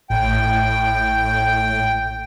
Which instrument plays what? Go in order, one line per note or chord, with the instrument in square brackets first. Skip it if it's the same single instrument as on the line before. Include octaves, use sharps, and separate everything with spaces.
[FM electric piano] A1 [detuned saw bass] A2 [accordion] G5